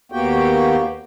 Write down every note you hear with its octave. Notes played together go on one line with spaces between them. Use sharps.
D#2 A#3 B3 F#4 G4 G5